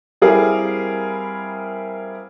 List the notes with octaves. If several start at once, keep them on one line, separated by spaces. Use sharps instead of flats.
G3 C4 E4 G#4 A#4 F5